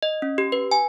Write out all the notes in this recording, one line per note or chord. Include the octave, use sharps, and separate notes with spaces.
D#5
C#4
G4
B4
G#5